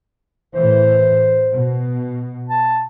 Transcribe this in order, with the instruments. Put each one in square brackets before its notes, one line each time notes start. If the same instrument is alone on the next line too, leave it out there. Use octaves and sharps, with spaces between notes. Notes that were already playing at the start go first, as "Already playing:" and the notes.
[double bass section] A2 E3 [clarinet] C5
[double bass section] B2
[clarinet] A5